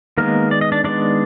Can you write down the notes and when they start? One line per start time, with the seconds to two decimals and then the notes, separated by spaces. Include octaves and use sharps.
0.18 D#3 G#3 A#3 B3 A#4
0.51 D5
0.61 D#5
0.72 D4 D5
0.84 D#3 G#3 B3 D4 D5